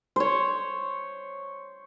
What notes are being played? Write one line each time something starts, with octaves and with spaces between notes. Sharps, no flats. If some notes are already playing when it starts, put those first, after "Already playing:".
C5 C#5